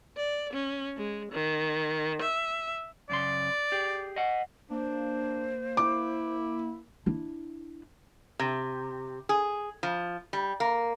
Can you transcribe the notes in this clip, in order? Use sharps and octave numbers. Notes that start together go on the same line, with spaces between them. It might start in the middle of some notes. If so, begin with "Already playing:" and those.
D5
C#4
G#3
D#3
E5
F#2 C#3 D5 C6
G4 G#4
D#5 F#5
A#3 D4 C5
E4 D6
D4 E4
C3
G#4
F3
G3
A#3